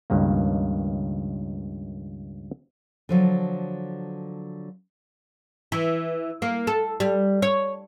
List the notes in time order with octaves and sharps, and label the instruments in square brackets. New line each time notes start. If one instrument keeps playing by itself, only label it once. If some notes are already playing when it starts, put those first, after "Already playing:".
[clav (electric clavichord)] C#2 G2 D#3 A#3
[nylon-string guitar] D3 F3 F#3
[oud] E3
A#3
A4
G3
C#5